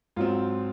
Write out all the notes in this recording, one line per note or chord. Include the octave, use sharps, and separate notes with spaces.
G#2 F#3 C4 F4